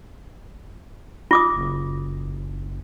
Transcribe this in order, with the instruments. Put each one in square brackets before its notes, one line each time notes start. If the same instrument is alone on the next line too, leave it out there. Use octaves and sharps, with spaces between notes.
[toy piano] F4 D6 D#6
[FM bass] F#1